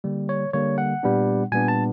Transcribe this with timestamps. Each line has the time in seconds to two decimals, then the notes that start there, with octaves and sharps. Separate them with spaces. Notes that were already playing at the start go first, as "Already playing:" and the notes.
0.04 D3 G3 A#3
0.29 C#5
0.53 D3 G3 A#3 C#5
0.78 F#5
1.03 A#2 G3 B3 D4
1.52 A#2 G3 B3 D4 G#5
1.68 A5